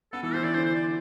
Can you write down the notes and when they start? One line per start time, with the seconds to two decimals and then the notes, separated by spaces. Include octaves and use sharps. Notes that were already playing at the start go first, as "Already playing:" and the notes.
0.12 B3 A4
0.23 E3 A4
0.34 E3 C5
0.44 E3 D5
0.54 D3 C5
0.65 C5
0.75 D5